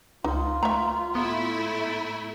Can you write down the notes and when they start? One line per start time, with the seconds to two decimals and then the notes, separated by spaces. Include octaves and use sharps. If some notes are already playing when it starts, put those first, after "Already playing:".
0.24 C#2 D#4 F4
0.63 A3 E5 A#5
1.15 A2 A3 B3 E4